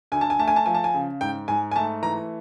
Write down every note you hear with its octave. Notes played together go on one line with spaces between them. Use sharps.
D2 G#5
A5
G#5
A3 A5
G#5
A5
F3 G#5
A5
G#5
C#3
G#2 G5
G#2 G#5
G#5
A3 A5
E3 A#5